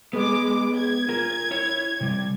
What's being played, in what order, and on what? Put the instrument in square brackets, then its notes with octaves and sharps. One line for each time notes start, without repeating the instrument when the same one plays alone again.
[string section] G#3 D6 [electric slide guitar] B3
[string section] G#6
[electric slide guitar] F4 A#4
E4 C#5
C3 G3